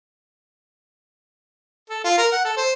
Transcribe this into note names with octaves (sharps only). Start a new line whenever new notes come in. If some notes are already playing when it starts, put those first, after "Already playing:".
A4
F4
A#4
F#5
A4
C5